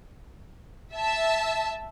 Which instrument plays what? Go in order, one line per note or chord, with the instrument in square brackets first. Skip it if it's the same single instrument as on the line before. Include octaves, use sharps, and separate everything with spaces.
[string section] E5 A5